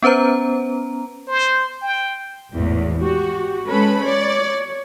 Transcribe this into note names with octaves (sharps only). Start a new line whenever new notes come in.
B3 C#4 B4 C5 A#5
C5
G5
G#1 E2 A2
F#4 G4
G#3 C#4 A4 B4 B5
C#5 D5